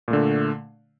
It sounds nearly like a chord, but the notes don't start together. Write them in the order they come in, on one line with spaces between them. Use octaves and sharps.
A#2 A3 D3